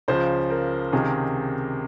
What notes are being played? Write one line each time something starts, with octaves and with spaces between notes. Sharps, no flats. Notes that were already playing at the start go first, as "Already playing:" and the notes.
C#2 C#3 F3 C5
A#4
C#2 C3 D#3 G#4